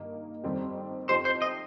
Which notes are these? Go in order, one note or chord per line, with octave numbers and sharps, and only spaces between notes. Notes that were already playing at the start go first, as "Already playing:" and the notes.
Already playing: G2 D#3 A#3 D#4
F2 D#3 G3 C4 G4
F2 F3 D#4 G4 C5
C5
D#5